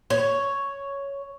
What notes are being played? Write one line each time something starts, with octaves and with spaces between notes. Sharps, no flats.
C#5